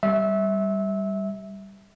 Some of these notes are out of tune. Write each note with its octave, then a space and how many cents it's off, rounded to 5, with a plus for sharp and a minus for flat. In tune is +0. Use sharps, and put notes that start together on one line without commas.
G3 +0 E5 -20